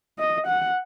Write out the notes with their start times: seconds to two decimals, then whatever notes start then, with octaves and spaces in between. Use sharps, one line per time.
0.19 D#5
0.47 F#5